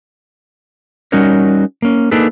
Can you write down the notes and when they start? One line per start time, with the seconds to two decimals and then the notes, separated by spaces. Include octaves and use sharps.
1.12 G3 C#4 D#4 F#4 A#4 C#5
1.82 A#3 C#4
2.11 A#3 D4 D#4 G#4 A4 B4